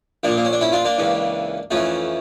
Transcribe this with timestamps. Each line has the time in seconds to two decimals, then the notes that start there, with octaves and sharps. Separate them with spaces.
0.23 A#1 A#2 A#3 D4
0.37 A#3
0.45 C#4
0.53 D4
0.61 C#4 E4
0.72 D4 F4
0.85 A#3 D4
0.98 C#2 C#3 E3
1.71 F2 E3 A3 C#4